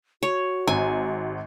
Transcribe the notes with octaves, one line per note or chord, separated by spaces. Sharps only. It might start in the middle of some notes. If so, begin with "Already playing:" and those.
F#4 C#5
G#1 G#5